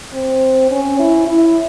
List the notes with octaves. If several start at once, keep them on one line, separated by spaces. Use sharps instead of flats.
C4
C#4
E4
E4